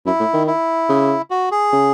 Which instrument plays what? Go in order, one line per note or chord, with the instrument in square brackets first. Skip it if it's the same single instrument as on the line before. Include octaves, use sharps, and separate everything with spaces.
[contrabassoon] F#2 [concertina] E4
[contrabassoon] A2
D#3
[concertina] E4
[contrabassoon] C#3
[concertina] F#4
G#4
[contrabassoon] C#3